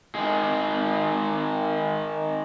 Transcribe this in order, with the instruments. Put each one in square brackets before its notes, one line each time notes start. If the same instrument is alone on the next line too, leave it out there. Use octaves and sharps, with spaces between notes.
[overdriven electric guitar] D#3 G#3